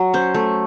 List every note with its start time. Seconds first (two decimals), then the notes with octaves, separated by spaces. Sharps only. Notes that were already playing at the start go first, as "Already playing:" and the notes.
Already playing: F#3
0.14 C#4 C5
0.34 A3